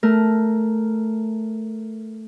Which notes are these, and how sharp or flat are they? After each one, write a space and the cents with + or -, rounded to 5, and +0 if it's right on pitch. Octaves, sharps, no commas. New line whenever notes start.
A3 +0 A#4 +0